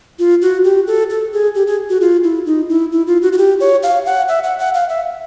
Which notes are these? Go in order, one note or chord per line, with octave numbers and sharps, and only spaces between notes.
F4
F#4
G4
A4
A4
G#4
G4
G#4
F#4
F4
E4
D#4
E4
E4
F4
F#4
F#4
G4
C#5
F5
F#5
E5
F#5
F#5
F5
E5